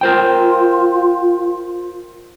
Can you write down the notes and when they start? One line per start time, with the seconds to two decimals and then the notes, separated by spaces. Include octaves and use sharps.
0.01 F4 A#4 C5 G5